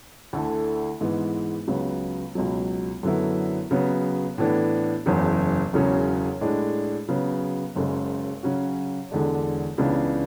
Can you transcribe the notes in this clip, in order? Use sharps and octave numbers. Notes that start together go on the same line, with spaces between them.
D2 D3 A3 E4
G#2 E3 G#3 B3
C#2 C#3 F#3 B3
C#2 B2 F#3
F#2 D3 F#3 B3 E4
C#3 F#3 B3
A2 E3 B3 D4
F#1 E2 C#3
E1 E2 C#3 F#3 C#4
A2 G#3 D4
C#3 F#3 B3
F#1 F#2 C#3 G#3
C#3 F#3 C#4 F#4
E1 E2 D3 G#3 D4
C#2 C#3 E3 B3 D4